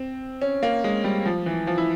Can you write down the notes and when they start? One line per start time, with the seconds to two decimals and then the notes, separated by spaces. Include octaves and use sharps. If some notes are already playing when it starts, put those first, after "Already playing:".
Already playing: C4
0.42 C#4
0.63 A#3
0.84 G#3
1.04 G3
1.26 F3
1.46 E3
1.67 F3
1.78 E4